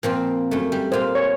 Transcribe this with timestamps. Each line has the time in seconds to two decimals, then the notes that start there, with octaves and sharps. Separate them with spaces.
0.03 A#2 F3 C4
0.51 F#2 A3
0.72 G3
0.92 A#2 F4 C5
1.15 C#5